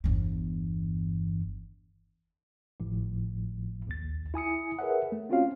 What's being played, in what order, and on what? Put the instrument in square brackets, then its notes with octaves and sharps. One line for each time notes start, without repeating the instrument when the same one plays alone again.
[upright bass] G1 E2
[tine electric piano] G#1 A2 F3
A#1 D#2 A6
E4 G#5 D#6 C#7
G#4 A#4 B4 C#5 E5 F#5
A3
C4 C#4 F4 F#4 C#5 F5